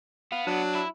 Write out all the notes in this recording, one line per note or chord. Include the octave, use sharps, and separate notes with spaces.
B3 F5
F#3 D4
E4